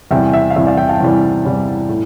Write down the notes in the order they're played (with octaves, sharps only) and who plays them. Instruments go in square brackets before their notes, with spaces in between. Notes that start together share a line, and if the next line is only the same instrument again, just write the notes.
[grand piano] E2 C3 E3 G3 E5 G5
E5
F5
E2 C3 E3 G3 E5
D5 F5
E5 G5
F5 A5
E2 C3 E3 G3
E2 C3 E3 G3
A2